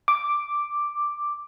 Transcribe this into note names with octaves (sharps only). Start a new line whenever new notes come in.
D6